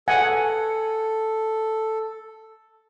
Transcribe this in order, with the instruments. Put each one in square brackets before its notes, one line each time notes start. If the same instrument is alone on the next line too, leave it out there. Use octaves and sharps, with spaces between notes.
[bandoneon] A4 [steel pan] F#5 G#5